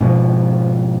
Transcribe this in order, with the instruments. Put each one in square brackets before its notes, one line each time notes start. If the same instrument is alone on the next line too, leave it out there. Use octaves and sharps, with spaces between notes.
[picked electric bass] G#2 B2 F3